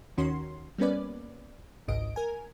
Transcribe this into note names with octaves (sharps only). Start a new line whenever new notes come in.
D#2 D#3 C#4 F#4 C6
G3 A#3 B3 C#4 B4 D5
G#1 C#2 G#2 D#5 D7
A#4 G#5